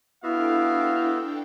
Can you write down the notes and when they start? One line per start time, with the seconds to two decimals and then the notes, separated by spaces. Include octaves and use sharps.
0.23 B3 D4 E4 F#4 A4 E5 F5 G5